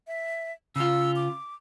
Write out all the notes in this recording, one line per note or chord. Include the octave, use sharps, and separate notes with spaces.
E5
C#3 F4 E6
D6